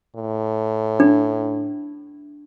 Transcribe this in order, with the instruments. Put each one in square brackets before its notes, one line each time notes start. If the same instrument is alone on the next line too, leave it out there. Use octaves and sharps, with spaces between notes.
[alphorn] A2
[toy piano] D4